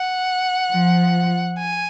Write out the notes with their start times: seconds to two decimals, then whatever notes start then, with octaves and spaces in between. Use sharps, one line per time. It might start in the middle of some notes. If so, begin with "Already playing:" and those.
Already playing: F#5
0.71 F3
1.60 G#5